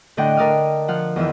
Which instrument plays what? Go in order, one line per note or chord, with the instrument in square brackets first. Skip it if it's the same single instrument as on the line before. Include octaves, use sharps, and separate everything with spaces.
[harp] A2 D3 D#5 F#5 G5 D6
D3 A#4 D5 D#6 F6
F3 F#5 F6
E2 D#3 E3 E6